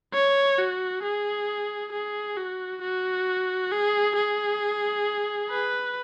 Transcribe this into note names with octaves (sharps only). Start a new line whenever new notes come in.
C#5
F#4
G#4
G#4
F#4
F#4
G#4
G#4
B4